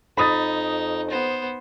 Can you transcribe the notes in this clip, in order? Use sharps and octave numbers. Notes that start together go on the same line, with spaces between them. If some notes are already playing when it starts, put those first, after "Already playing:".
F2 D#4 B5 D#6 A6
B3 C5